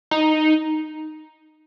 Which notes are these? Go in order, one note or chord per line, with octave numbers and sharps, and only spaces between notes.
D#4